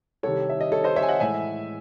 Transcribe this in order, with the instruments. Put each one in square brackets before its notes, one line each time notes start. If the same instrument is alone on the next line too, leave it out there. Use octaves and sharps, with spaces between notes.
[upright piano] C2 C3 D#3 A4 C#5
E5
D#5
A4 C#5
C5 D#5
C#5 E5
G#5
D#5 F#5
A2 E3 G#3 E5 G#5